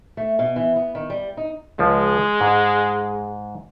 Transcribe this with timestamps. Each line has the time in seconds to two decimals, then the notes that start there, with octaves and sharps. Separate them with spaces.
0.17 A3
0.39 B2
0.56 E3
0.76 B3
0.95 D#3
1.10 G3
1.37 D#4
1.79 C#2 F3 G#3
2.41 G#2